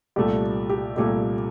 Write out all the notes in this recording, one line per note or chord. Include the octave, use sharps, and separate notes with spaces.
C2 A#2 A3 G4
G4
C2 A#2 A3 G4